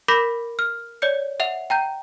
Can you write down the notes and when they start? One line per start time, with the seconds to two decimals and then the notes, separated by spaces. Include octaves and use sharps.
0.08 A#4 B5 D6 G6 A#6 B6
0.59 F6
1.02 C#5 D5 G6 C#7
1.40 E5 F#5 F7
1.70 G5 A#5 G6